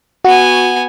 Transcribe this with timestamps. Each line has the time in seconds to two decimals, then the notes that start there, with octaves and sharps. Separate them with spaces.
0.25 B3 F#4 G#5